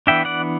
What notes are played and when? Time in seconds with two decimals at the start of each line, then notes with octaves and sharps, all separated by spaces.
0.07 E3 B3 D4 E5 G5
0.25 D5 F#5